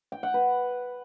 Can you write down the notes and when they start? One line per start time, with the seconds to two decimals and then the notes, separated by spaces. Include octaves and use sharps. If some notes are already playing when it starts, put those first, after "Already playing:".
0.12 G5
0.23 F#5
0.34 B4